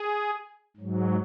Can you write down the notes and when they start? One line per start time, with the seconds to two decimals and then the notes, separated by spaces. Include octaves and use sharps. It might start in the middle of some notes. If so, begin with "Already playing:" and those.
Already playing: G#4
0.77 G#2 F#3